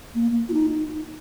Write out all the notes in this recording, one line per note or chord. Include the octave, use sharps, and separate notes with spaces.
A#3
F4
D#4